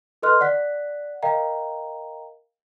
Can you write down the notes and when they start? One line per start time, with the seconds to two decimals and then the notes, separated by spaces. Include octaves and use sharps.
0.22 A4 B4 D#5 C6 F6 F#6
0.40 D5 F#5 F#6 B6
1.23 A#4 D#5 F5 G5 A#5